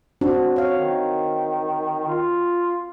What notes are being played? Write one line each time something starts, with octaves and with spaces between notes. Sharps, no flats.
C4 D4 F#4
C#5 F5
D#3
F4